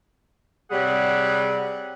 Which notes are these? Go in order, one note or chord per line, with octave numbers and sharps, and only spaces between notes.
C3 G3 G#4 C#5 F#5